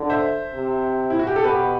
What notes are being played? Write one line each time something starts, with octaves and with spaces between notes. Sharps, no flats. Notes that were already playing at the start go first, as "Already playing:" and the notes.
Already playing: D3
C5 E5
C3
E4
F#4
G4
A4
B2 G4 B4